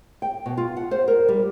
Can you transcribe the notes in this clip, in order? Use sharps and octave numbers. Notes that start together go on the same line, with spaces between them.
G5
B2
F4
F#5
C5
A#4
G3